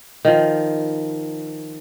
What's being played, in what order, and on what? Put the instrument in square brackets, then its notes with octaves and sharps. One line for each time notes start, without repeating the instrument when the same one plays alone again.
[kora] D#3 F3